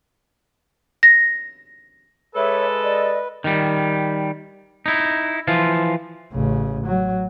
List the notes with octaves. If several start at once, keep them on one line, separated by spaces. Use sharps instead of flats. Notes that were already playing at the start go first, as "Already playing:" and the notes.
A#6
G#3 A4 B4 C#5 E5 D6
D5 D#5
D#3 G3
D#4 E4
E3 F3 F4
A1 C#3
F#3